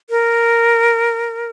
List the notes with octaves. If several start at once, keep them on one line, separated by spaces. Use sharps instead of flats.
A#4